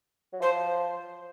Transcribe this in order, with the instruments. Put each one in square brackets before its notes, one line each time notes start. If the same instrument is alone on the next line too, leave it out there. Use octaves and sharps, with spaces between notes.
[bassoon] F#3
[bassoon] F3 [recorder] C5